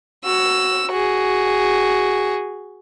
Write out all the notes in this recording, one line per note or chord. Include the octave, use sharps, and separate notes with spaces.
F#4 E6
F#4 G#4